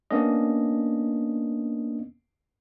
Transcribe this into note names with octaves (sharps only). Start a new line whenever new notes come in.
A#3 B3 C#4 D4 D#5